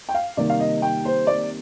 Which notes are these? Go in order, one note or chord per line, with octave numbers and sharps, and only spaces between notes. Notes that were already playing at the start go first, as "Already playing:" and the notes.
G5
F5
C3 D#3 G3 A#3 D5
F5
D#5
G5
C5
D5